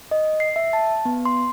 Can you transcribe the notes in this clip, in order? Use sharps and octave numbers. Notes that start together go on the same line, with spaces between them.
D#5
C7
E5
A5
B3
C6